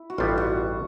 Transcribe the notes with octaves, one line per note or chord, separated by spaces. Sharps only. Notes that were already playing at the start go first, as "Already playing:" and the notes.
Already playing: E4
F#4
A1 G2 D#3 G3 B3 F4
F#4